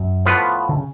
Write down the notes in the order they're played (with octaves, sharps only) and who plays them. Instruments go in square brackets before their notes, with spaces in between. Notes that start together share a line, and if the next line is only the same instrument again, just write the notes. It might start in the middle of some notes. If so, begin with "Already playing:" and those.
Already playing: [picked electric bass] F#2
[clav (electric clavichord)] A2 F3 B3 F4 B4
[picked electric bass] D3
C#3